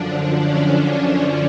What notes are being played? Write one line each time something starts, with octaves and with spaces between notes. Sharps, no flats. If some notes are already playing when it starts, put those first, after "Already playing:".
Already playing: F#2 D3 F3 D4
C#4